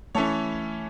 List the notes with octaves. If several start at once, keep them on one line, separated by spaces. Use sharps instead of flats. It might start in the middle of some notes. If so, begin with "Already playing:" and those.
E3 A3 C#4 E4 A4 C#5